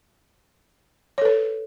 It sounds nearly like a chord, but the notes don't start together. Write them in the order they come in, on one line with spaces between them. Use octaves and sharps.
C#5 A4 B4